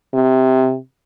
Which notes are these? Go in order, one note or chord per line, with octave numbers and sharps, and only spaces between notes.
C3